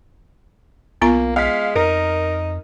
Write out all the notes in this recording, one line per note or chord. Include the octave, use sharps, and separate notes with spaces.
B1 A#3 B3 F4 A#5
G#3 F5 F6 B6
F2 D#4 A#4